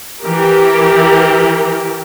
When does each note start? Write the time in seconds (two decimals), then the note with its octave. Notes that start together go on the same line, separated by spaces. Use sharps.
0.22 E3 G4 A#4